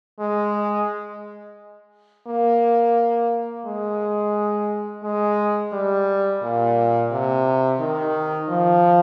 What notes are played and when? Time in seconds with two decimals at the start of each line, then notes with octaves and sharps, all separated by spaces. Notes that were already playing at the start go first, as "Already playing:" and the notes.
0.19 G#3
2.27 A#3
3.66 G#3
5.04 G#3
5.73 G3
6.42 A#2
7.11 C3
7.80 D#3
8.49 F3